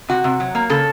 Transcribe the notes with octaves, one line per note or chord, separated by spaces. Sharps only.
C3 F#4
C3
F#3
A#3
C#3 A4